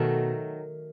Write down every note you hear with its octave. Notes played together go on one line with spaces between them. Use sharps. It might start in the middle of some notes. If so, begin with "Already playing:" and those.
Already playing: B2 D#3 F#3 A3